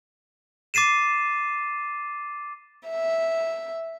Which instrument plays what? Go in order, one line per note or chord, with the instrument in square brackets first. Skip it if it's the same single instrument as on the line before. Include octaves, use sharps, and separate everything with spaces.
[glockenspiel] D6 A6 C7 D#7 E7
[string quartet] E5